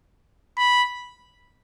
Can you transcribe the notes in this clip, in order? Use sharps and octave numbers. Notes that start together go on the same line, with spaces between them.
B5